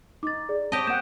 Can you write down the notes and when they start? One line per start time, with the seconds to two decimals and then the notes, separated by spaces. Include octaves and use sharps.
0.23 D#4 D6 A6
0.49 G#4 D5
0.72 C4 G4 C#5 D#5 A5
0.87 A#3 F#5 G6 D7 E7